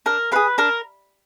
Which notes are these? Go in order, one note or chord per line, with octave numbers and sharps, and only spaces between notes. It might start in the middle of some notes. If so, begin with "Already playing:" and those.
D4 A#4
F4 G#4 B4
D4 A#4